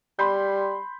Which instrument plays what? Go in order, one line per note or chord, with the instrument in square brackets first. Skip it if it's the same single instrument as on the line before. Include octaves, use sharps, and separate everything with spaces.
[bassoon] G3 [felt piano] B5 C6 G6